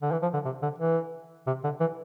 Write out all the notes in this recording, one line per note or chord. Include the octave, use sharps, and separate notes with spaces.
D3
E3
F3
D3
C3
D3
E3
C3
D3
E3